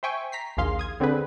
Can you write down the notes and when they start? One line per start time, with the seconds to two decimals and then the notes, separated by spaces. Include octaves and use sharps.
0.03 C5 E5 G5 G#5 C#6
0.32 A#5 B6 C7
0.57 A#1 D#2 G#4 F5 C6
0.79 D#6 G#6
1.00 D3 C4 G#4 B4